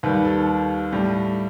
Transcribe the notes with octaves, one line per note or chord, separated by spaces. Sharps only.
D#2 D#3 G3 B4
A4
A2 G3